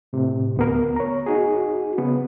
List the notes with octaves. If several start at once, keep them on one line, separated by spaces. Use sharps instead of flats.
A2 C3
D2 B3 A#4
C#5 A#5
D#4 F#4 G#4
C#3 B3